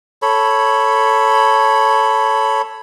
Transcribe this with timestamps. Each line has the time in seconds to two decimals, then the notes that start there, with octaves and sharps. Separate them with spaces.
0.22 A4 C#5 B5